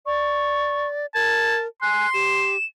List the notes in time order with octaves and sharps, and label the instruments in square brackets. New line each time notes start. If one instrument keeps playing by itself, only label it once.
[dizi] D5 [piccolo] C#6
[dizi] A#4 [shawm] A5 [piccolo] G#6
[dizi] G#5 [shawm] C6 [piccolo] F#6
[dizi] G4 [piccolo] E7